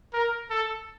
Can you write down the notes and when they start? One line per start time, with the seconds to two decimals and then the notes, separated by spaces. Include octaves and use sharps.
0.13 A#4
0.50 A4